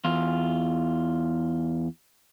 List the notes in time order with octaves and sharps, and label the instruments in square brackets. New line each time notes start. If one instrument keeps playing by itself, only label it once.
[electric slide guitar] E2 F4